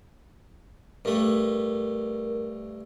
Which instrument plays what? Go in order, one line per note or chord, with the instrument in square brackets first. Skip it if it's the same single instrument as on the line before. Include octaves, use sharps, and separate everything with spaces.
[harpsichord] G2 A3 [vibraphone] A#4